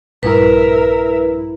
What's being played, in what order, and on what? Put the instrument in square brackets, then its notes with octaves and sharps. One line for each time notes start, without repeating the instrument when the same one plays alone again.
[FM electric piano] A#1 G2 E4 [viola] A#4 E5 [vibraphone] B4